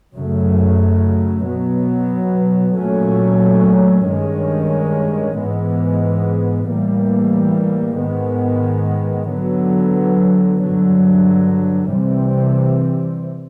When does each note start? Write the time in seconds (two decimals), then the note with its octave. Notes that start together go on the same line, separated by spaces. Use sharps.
0.15 F#2 C#3 F#3 A3
1.46 B2 F#3 B3
2.76 A#2 F#3 A3 C#4
4.07 G2 D#3 G#3 C#4
5.38 G#2 E3 G#3 B3
6.69 A2 E3 G3 A#3
7.99 G#2 D#3 G#3 B3
9.30 D3 F#3 B3
10.61 G2 D3 F#3
11.92 C3 E3 G3 C4